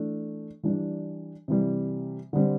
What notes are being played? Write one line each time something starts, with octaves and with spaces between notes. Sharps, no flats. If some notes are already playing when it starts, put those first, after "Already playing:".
Already playing: E3 A3 D4
E3 G3 D4
C3 E3 G3
D3 G3 C4